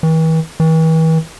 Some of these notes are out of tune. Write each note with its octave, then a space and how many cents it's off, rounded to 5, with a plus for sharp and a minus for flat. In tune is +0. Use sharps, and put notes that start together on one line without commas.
E3 -40
E3 -40